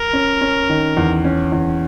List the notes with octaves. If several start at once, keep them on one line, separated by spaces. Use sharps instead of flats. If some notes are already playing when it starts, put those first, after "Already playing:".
Already playing: A#4
C#4
C#4
D#3
E2
C#4
E2